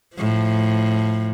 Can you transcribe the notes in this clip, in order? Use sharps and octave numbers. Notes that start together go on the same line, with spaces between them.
A2 F3